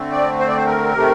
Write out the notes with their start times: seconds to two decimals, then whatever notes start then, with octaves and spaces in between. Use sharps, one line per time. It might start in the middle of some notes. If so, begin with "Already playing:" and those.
Already playing: D3 A3 C4
0.12 D5
0.39 C5
0.48 D5
0.57 C5
0.66 A#4
0.94 C3 D#3 A3